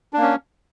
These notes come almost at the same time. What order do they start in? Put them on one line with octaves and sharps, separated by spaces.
D4 A#3 C#4